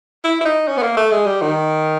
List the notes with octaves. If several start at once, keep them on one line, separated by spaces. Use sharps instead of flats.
E4
E4
D#4
C#4
B3
A#3
A3
G#3
G3
D#3